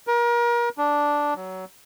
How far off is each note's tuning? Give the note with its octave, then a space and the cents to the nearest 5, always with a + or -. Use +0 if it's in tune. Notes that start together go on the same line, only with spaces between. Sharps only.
A#4 +35
D4 -5
F#3 +20